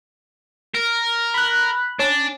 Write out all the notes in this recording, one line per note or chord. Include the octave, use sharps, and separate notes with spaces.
A#4
B5 F#6
C#4 D4